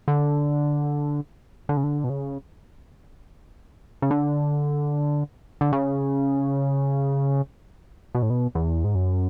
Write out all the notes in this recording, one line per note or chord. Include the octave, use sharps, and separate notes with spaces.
D3
D3
C#3
D3
B2
C#3
C#3
D3
D3
C#3
B2
A2
B2
E2
G#2
F#2